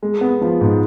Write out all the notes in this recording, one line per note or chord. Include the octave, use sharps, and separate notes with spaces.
G#3
B3
F3
G#2